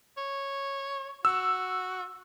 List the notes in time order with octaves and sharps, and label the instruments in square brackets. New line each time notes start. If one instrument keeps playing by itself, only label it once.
[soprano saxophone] C#5
[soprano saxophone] F#4 [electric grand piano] E6